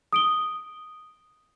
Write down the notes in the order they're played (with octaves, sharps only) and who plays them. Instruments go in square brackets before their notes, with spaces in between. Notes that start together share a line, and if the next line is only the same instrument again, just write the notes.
[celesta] D#6 D7 G7